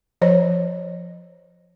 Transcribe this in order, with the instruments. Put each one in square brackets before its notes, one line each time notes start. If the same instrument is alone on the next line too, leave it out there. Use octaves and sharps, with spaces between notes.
[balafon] F3 C5 C#5